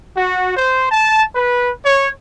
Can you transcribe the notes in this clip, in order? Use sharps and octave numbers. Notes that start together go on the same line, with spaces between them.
F#4
C5
A5
B4
C#5